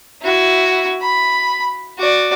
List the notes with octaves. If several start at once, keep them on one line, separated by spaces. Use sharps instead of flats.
E4 F#4
B5
F#4 D5